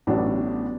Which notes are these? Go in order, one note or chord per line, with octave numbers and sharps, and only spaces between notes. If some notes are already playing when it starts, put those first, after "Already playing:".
A1 A2 F#3 B3 D4